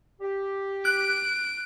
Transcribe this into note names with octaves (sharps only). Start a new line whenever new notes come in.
G4
F#6 D7